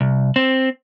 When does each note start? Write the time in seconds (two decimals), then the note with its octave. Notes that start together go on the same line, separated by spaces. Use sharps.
0.01 C2
0.36 C4